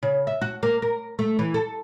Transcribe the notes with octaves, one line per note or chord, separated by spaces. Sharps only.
C#3
E5
F#4
A#3
A#4
A3
E3
A4